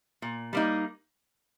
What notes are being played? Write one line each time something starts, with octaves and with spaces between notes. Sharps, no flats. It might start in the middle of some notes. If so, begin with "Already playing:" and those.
A#2
G3 A#3 D#4